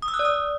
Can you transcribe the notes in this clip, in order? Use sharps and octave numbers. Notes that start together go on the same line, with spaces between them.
D#6
E6
F#6
D5
D#6